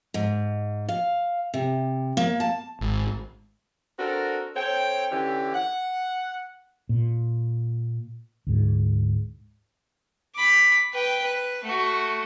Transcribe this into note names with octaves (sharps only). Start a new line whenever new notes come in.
G#2
F5
C3
A#3
A5
G#1
C4 D4 F#4 A4 A#4
C4 A4 C#5 G5
D3 E3 C#4 G4
F#5
A#2
D2 G#2
B5 D6
B4 G5
B4
A3 F#4